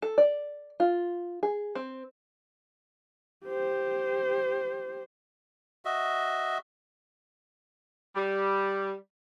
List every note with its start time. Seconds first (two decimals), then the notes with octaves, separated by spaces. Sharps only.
0.02 A4
0.18 D5
0.80 F4
1.43 G#4
1.75 C4
3.46 G4 C5
5.85 F#4 D#5 E5
8.15 G3